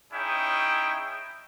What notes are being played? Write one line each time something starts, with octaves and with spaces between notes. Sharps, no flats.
C#4 D#4 E4 G#4 G5